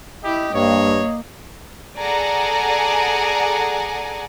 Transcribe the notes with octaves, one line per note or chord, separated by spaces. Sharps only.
E4 G4 D#5
G2 A#3 C#5
G#4 A4 D5 F#5 G#5 A#5